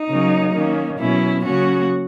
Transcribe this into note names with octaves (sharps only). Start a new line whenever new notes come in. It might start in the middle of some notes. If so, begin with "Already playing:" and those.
Already playing: D#4
C#3 F#3 A#3 C#4
D#3 A#3 C#4
B2 F#3 C#4 E4
C#3 F#3 A#3 C#4 F#4